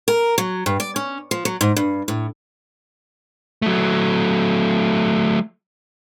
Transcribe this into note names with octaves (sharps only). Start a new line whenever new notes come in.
A#4
F#3
G2
D5
C#4
F3
F#3
G#2
G2
A2
F#3 A3